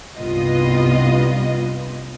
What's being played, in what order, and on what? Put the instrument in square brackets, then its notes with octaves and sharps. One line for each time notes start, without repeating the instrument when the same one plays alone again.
[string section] C2 G2 B3 F4 D#5